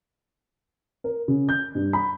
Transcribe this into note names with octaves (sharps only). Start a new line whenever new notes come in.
A#4
C#3
G6
G2
B5